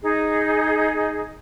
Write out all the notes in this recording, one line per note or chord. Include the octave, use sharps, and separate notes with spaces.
D#4 G#4